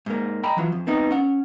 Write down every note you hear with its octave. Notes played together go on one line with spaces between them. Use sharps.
G#2 A#3
D#5 G5 A#5 B5
E3 F#3 F4
F2
B3 C4 D#4
C#4 F#5